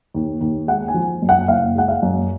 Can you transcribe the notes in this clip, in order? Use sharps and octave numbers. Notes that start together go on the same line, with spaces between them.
D#2
D#2
G#3 F#5
G#5
F3
F#2
F#5
F#1 F5
G#3 F#5
F5
F#2